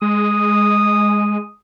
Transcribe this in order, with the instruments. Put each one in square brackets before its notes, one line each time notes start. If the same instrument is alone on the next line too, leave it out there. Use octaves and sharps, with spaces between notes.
[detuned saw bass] G#3 [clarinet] D#6